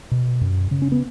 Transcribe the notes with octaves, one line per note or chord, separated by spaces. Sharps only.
B2
F#2
C#3
C#4
B3